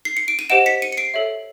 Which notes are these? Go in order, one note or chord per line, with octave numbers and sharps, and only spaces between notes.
C7
C#7
D7
D#7
G4 C5 D#5 F#5 D7 E7
B6 C#7
C#7 D#7
C#7
C7 D7
A4 C#5 E5